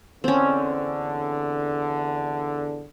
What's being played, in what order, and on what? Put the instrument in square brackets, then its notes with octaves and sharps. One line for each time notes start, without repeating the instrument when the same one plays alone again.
[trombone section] E2 D3 [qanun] C4 C#4